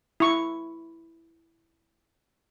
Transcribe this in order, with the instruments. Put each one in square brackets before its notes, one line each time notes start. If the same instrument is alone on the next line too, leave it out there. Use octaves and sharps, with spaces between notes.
[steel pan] E4 C#6